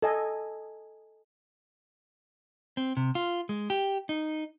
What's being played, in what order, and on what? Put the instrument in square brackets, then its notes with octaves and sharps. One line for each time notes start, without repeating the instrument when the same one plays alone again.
[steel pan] A4 D#5 G#5
[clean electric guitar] C4
C3
F4
G#3
G4
D#4